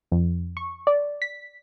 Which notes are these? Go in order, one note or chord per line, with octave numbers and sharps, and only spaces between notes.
F2
C#6
D5
B6